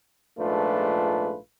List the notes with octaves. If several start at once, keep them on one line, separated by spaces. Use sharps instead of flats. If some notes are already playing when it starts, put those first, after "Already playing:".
A#1 G#2 A3 D4 F4 B4